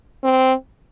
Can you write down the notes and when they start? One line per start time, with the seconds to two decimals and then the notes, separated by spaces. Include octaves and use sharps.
0.24 C4